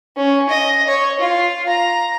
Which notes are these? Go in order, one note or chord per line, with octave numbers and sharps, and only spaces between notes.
C#4
D#5
C#5
F4
A#5